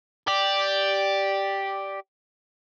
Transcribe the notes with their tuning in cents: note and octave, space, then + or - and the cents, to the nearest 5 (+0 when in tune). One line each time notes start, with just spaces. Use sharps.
G4 +0 D5 +0